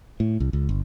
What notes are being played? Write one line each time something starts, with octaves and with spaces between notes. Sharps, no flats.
A2
C2
C#2
G1